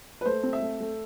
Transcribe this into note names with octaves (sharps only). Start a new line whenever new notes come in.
B4
A3 C5
C4
E5
A3
A3